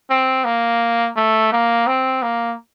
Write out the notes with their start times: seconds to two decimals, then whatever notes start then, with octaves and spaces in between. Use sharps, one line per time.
0.10 C4
0.45 A#3
1.16 A3
1.52 A#3
1.87 C4
2.22 A#3